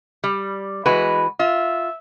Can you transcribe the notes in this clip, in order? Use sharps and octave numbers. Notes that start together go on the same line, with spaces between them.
G3
E3 G#3 F#4 B4
F4 E5